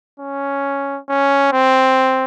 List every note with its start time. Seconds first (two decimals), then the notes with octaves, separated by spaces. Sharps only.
0.20 C#4
1.09 C#4
1.52 C4